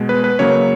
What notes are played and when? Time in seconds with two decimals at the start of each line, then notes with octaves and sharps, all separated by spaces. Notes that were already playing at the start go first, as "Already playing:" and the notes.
Already playing: B2 G#3
0.09 B4
0.24 B4
0.39 C#3 F#3 A#3 C#5